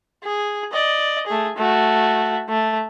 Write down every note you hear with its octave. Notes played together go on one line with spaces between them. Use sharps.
G#4
D5 D#5
A3 G#4
A3 F#4
A3